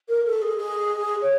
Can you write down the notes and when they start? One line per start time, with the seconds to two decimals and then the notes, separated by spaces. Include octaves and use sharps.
0.09 A#4
0.25 A4
0.41 G#4
0.57 G#4
1.22 C#5